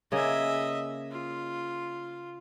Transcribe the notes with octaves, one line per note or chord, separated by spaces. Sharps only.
C#3 A#3 G#4 D#5 E5
F4